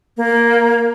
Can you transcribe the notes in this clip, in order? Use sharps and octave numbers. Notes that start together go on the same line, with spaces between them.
A#3